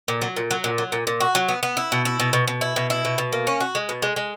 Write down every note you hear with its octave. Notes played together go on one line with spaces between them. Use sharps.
A#2
F#3
A#2
F#3
A#2
F#3
A#2
A#2
F#4
F#3
B3
B3
E4
B2
E4
B2
B2
B2
E4
B2
E4
B2
B2
A#3
C#4
F#4
G#3
B2
G#3
G#3